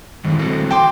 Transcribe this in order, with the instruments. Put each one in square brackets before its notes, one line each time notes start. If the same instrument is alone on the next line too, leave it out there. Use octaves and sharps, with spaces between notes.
[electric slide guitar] D#3 E3 G#3
C4 F#4 A4
[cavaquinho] G5 C6 D6